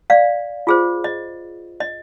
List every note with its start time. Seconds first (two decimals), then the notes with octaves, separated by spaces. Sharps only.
0.10 D5 F5
0.67 F4 G#4 C5
1.04 D#5
1.80 D#5